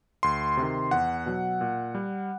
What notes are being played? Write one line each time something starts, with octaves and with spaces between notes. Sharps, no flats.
D2 C6
C3
D#3
E2 F#5
B2 F#3
A#2
G3